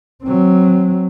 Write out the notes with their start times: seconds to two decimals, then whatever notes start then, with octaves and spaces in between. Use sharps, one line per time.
0.24 F#3 C4